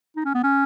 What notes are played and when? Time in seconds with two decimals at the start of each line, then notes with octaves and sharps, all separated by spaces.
0.16 D#4
0.25 C#4
0.35 B3
0.44 C#4